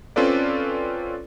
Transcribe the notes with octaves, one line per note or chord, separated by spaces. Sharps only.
C4 C#4 F4 A4 B4 D5